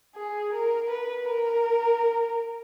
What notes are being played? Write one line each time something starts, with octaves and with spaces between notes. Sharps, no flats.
G#4
A#4
B4
A#4